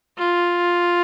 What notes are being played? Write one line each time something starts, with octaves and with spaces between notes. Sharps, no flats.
F4